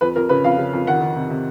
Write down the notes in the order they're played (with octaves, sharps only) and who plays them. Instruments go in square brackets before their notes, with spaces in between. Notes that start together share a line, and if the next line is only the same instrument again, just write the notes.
[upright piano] F2 B4
F2 A#4
C#3 B4
F2 F5
C#3
F2
D#3 F#5
D#3
C3
C3